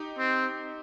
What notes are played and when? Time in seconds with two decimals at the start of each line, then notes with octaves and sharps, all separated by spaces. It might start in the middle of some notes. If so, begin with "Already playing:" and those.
Already playing: D#4 G4
0.18 C4